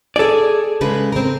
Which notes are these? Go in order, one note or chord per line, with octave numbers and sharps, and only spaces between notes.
G#4 A4 D5 G#5
C#3 G#3 B4
C4 A#4